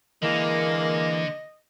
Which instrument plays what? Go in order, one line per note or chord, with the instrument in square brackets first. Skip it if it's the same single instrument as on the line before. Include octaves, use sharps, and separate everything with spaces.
[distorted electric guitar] D3 [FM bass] E3 [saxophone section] G#3 A#3 [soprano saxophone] D#5